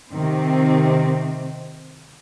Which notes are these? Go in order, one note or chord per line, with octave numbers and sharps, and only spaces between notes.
C3 D#3 C4